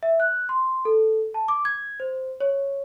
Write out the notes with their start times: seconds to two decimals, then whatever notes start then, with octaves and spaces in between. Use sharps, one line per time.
0.03 E5
0.20 F#6
0.49 C6
0.85 A4
1.34 A5
1.48 D6
1.65 G#6
2.00 C5
2.40 C#5